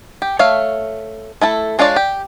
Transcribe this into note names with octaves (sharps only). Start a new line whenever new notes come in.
G4
A3 C#5 E5 F5
A3 E4 A4
G#3 D4 F4 C#5 D5
G4